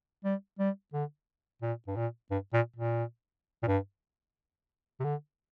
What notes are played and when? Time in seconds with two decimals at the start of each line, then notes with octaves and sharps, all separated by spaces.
0.24 G3
0.59 G3
0.93 D3
1.62 A#2
1.87 G2
1.96 A#2
2.31 G2
2.53 A#2
2.76 A#2
3.63 A#2
3.67 G2
5.00 C3
5.04 D3